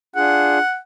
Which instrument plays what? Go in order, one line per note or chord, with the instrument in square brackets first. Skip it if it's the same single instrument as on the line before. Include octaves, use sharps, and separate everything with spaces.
[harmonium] D4 F4 G#4 [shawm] F#5